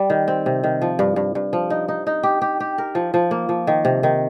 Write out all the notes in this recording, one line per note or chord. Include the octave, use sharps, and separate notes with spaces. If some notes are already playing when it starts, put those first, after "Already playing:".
Already playing: G3
D#3
C4
C3
D#3
F3
G2
G2
G2
F3
D#4
D#4
D#4
G4
G4
G4
A#4
F3
F3
A#3
F3
D#3
C3
D#3